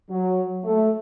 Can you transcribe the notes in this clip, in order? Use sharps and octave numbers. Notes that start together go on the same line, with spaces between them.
F#3
A3